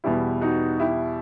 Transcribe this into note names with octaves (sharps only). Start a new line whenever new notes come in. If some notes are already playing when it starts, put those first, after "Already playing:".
E2 B2 G3 E4
D#4 F#4
E4 G4